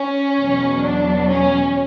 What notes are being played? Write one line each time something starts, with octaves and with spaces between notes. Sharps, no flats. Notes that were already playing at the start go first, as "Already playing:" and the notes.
Already playing: C#4
E2 B2 F#3
D4
C#4